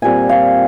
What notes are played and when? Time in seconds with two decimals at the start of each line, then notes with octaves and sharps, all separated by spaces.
0.02 A#2 G3 C4 G#5
0.29 F5